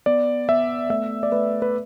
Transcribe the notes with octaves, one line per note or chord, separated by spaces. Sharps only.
B3 D5
B3 E5
A3 E5
D5
A3 B4
B4